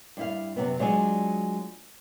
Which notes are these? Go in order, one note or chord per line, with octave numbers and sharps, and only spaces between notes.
G2 E4 F5
F#2 C3 B3
F#3 G#3 D4 F4 G#4